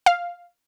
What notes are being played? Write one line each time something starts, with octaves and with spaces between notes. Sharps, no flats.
F5